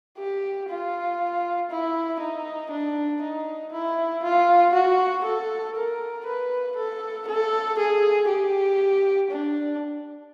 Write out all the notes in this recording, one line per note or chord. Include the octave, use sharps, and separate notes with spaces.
G4
F4
E4
D#4
D4
D#4
E4
F4
F#4
A4
A#4
B4
A4
A4
G#4
G4
D4